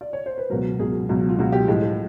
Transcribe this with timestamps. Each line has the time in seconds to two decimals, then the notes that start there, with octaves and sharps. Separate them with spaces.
0.01 D5
0.13 C#5
0.26 C5
0.38 B4
0.50 C#2 B2 F#3 A#4
0.79 C#2 B2 F#3 G#4
1.09 C#2 B2 F#3
1.29 F4
1.38 C#2 B2 F#3 F#4
1.52 G4
1.68 A2 F3 G#3